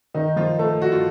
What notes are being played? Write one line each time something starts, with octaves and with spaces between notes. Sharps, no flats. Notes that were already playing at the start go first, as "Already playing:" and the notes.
D#3 D#4
F3 F4
A3 A4
F#4
F4